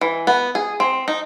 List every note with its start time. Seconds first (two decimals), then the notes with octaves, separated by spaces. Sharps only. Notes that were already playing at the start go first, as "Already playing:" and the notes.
0.01 E3
0.27 B3
0.55 G#4
0.80 C4
1.08 D#4